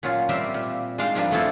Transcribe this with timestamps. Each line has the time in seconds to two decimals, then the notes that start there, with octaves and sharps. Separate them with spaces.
0.03 A#2 F#3 C#4 F4
0.29 G3 C4 G4 A#4 C5 E5
0.54 A#2
0.98 G#3 D4 D#4 C5 F5 G5
1.15 G2 F3 G3 A#3 D4
1.31 A3 B3 C4 E4 F4 A4